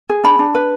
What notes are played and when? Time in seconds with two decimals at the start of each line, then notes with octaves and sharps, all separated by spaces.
0.09 G#4
0.24 D4 B5
0.39 D4
0.55 B4